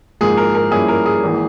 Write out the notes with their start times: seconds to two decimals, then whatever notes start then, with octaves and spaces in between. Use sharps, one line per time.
0.21 G#2 F3 A#3 G#4
0.37 A#4
0.55 A#4
0.71 G2 F3 A#3 C#4 E4 G#4
0.88 A#4
1.06 G#4
1.23 G#1 E3 A#3